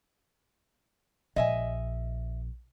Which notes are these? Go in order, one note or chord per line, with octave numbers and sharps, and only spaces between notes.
A#1 D#5 E5 G#5